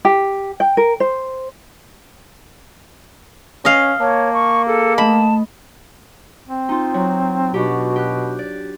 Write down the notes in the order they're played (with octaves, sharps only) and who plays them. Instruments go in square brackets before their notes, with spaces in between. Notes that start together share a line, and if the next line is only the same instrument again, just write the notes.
[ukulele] G4
G5
A#4
C5
[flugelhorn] C#4 [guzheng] D#5 F5
[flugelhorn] A#3 [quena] C#5 [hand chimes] A5
[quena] C#6
[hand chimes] G#4 [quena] A4
[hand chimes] A3 D#5 [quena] A5 [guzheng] B5
[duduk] C4
[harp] D#4 F4
F#3
[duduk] B2 [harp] D4 F#4 G4
[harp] G4 F#6
D5